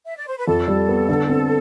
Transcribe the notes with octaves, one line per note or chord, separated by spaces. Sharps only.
E5
D5
C5
B4
F2 A4
G3
B3
D3
C4